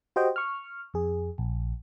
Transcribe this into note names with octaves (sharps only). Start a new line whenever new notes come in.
F#4 G4 C5 D#5 G5
C#6 F6
F2 G#4
A#1